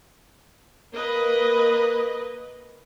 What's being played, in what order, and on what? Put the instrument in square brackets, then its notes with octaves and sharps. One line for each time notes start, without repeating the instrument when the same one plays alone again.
[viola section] A#3 A#4 B4 D#5